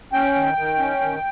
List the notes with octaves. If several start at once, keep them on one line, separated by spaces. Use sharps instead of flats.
C#4 G5
D#3
D#3
C#4
D#3